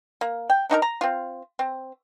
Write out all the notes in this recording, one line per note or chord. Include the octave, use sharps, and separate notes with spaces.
A#3
G5
D4 D#4 F#4 A#4
A#5
C4 F4
C4